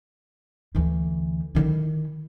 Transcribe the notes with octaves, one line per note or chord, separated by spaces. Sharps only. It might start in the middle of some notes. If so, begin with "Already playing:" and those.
D2 E3
D#3 E4